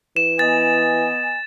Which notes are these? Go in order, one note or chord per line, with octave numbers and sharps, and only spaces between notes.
E3 E7
B3 D#5 G#5 A6